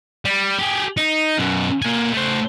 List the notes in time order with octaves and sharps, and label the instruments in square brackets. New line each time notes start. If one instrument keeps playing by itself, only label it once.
[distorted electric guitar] G3
G4 G#4
D#4
F#2 B2
A#3 G#5
A3 C5